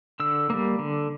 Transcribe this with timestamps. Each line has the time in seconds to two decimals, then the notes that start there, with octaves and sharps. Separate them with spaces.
0.20 D3 E6
0.50 G3 A#3
0.79 D3